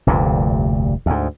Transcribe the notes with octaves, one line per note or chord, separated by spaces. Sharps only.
F1 D2 G2 A#2
D2 G#2